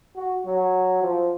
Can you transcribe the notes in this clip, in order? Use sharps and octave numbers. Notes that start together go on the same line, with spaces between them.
F#4
F#3
F3